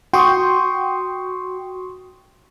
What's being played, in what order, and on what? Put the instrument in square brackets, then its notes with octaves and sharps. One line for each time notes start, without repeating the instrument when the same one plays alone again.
[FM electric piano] F#4 G5 [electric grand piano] C6 C#6 D#6